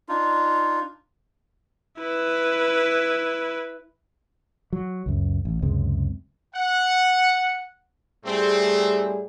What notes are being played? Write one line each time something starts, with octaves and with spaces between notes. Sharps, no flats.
D4 D#4 F4
E4 B4
F#3
C#2 F#2
A1
C#2 F#2 C3 G#3
F#5
A2 G3 A3 C4 G#4